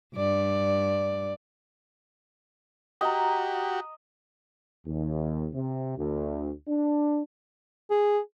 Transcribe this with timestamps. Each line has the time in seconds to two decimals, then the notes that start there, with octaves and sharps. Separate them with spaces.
0.15 G2 D5
3.01 F#4 G4 D#5 A#5
4.86 D#2
5.53 C3
5.97 D2
6.68 D4
7.90 G#4